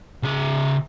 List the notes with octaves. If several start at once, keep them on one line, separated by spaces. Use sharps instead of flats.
C#3 E5